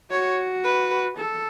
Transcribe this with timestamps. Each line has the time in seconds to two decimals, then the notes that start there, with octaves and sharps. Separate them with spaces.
0.11 F#4 C#5
0.64 B4
1.17 A4